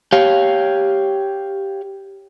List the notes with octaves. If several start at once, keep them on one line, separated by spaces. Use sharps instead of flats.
G4 C#5 F5